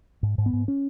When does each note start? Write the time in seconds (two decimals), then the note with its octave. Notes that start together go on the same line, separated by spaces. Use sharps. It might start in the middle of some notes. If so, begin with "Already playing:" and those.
0.23 G#2
0.38 G#2
0.46 B3
0.53 G#2
0.68 C#4